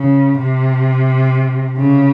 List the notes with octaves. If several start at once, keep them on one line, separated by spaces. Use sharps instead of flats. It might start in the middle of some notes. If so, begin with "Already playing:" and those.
Already playing: C#3
C3
C#3